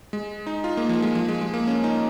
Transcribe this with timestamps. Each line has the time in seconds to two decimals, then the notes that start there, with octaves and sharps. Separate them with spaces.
0.13 G#3
0.47 D#4
0.64 F4
0.77 A#3
0.89 F3
1.02 G#3
1.15 F3
1.28 G#3
1.41 G#3
1.54 A#3
1.67 C#4
1.84 D#4